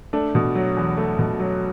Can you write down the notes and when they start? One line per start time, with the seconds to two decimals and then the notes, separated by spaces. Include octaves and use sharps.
0.13 A3 D4
0.35 B2
0.55 F#3
0.77 E2
0.97 A3
1.19 B2
1.40 F#3